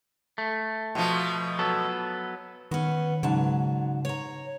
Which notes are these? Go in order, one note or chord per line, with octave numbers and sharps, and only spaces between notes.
A3
B2 F3
F#3 B3 A4
D#3 B3 C#4
G#2 C#3 F#3 A5
C#5 A#5